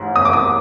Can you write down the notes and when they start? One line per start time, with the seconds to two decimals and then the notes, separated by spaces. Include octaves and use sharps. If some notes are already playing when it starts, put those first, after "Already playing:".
Already playing: A1 G#2
0.16 D#6
0.25 D6
0.33 D#6